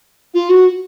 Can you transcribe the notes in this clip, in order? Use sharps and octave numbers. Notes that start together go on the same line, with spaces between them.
F4
F#4